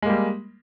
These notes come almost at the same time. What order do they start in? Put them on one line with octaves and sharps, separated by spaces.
G#3 A#3 G3